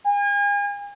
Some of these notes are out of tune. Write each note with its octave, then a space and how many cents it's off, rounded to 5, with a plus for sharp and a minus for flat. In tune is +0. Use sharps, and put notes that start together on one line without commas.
G#5 -40